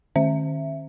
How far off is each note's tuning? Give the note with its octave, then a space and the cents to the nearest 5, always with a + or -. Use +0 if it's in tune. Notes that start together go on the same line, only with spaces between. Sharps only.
D#3 -35 C#4 -40 E5 +10